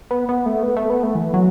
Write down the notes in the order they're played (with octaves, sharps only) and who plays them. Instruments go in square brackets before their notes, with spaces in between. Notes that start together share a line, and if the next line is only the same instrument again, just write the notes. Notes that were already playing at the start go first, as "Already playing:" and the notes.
[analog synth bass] B3
B3
A3
B3
A3
B3
A3
E3
F#3